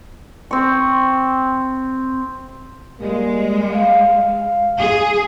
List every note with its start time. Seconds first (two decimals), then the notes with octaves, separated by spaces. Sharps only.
0.51 C4 C#6
3.00 G3 G#3 A#3
3.72 F5
4.80 G#4